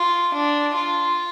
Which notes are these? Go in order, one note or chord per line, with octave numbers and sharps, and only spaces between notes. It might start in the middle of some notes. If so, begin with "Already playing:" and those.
Already playing: F4
D4
F4